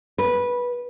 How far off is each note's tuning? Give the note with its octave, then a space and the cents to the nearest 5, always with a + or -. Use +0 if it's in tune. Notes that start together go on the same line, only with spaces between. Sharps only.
B4 -15